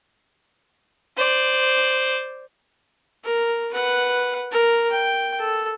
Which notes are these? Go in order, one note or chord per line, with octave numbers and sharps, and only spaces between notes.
C5 D5
A#4
B4 F#5
A#4
G5
A4